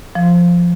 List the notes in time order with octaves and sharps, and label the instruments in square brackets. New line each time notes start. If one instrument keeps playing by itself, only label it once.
[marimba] F3